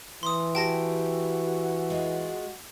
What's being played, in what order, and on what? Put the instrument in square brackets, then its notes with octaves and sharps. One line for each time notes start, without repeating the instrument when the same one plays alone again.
[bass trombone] E3 [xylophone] C6 D#6
[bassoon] F#4 [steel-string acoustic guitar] G4 [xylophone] G5 A5 A#6
[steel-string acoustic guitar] G#3 F4